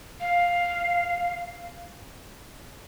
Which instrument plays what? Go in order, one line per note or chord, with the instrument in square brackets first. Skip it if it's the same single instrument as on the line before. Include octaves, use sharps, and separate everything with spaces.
[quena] F5